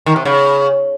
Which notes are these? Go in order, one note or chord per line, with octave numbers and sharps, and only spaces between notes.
D#3
C3
C#3